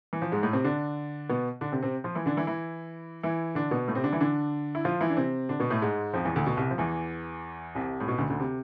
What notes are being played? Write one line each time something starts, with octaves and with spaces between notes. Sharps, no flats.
E3
F3
G#2 G#3
A2 A3
C3 C4
D3 D4
B2 B3
D3 D4
C3 C4
C3 C4
F3 F4
E3 E4
D3 D4
E3 E4
E3 E4
E3 E4
D3 D4
B2 B3
A2 A3
C3 C4
D3 D4
E3 E4
D3 D4
E4
F3 F4
E3 E4
D4
C3 C4
D3 D4
B2 B3
A2 A3
G#2 G#3
F2 F3
E2 E3
D2 D3
B2
C2 C3
F3
E2 E3
C2 C3
A2
B2
D2 D3
D2 D3
C3